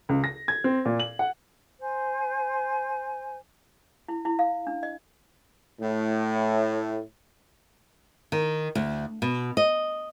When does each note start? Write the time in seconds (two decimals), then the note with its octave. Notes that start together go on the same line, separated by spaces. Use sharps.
0.09 C#2
0.24 A#6
0.48 G#6
0.64 C4
0.85 A#2
1.00 F#7
1.19 F#5
1.79 C5 G#5
4.08 E4
4.25 E4
4.39 F5
4.67 D4
4.83 D#5
5.81 A2
8.32 D#3
8.75 D2
9.22 B2
9.57 D#5